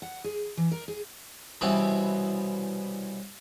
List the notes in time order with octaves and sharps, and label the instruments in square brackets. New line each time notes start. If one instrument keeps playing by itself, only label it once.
[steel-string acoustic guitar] F#5
G#4
E3
A#4
G#4
[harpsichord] C2 B2 E3 C4 C#4